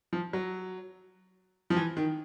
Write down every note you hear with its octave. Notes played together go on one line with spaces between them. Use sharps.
F3
F#3
F3
E3
D#3